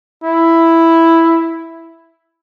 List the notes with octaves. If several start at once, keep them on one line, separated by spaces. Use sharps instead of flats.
E4